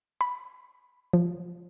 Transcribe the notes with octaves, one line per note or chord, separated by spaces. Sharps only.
B5
F3